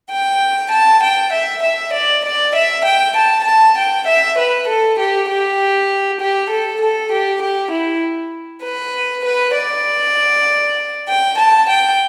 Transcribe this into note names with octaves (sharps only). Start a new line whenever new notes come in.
G5
A5
G5
E5
E5
D5
D5
E5
G5
A5
A5
G5
E5
B4
A4
G4
G4
G4
A4
A4
G4
G4
E4
B4
B4
D5
G5
A5
G5